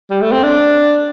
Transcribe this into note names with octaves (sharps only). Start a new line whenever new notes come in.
G3
A3
C4
D4